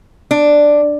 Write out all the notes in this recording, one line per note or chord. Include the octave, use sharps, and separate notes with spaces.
D4